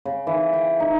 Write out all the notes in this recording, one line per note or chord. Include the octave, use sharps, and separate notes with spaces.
C#3
E3
G5
D#4